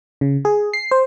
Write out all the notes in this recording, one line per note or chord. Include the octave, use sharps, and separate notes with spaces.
C#3
G#4
C7
C5